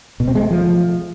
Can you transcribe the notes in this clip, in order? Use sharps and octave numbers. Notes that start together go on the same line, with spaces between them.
B2
C4
G#3
A3
F3